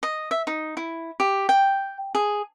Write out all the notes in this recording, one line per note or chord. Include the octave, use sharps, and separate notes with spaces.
D#5
E5
D#4
E4
G4
G5
G#4